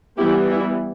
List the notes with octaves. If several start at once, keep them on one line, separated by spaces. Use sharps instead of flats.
E3 G3 B3 E4 G4
E4